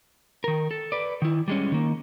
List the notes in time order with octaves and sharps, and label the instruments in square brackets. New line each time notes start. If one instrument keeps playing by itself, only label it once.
[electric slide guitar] D#3 A#4
A4
B4 D5
D#3 E4
G3 G#3 C#4
D#3 A#3